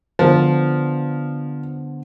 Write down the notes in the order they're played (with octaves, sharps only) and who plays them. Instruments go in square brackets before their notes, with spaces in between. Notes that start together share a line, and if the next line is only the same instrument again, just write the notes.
[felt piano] D3 B3 C5 [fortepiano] F3